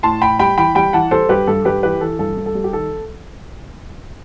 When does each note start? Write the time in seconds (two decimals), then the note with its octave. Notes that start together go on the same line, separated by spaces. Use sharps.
0.03 A2 A5 C6
0.22 A2 G5 B5
0.39 G3 G5 B5
0.57 E3 G5 B5
0.75 G3 G5 B5
0.93 E3 F#5 A5
1.11 G3 A4 C5
1.29 G2 G4 B4
1.47 G2 A4
1.65 G2 G4 B4
1.83 E3 G4 B4
2.01 E3 A4
2.19 G2 A4
2.37 G2
2.46 A4
2.55 G3
2.64 G4
2.72 D#3 A4